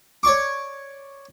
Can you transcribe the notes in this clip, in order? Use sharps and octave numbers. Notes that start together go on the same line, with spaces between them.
C#5 D5 C#6 D6